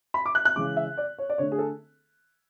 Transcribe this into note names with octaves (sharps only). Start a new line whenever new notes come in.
B5
D6
F#6
F#6
C#3 E3 G#3 D6
E5
D5
C#5
D5
D3 A3 C#5
G#4
A4